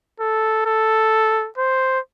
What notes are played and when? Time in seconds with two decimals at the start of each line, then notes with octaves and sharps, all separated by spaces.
0.20 A4
0.66 A4
1.58 C5